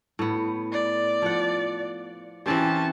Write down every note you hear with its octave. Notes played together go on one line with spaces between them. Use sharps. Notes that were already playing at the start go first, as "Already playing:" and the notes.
A2 B3
D5
F3 F#5
E3 C4 C#4 G4 A5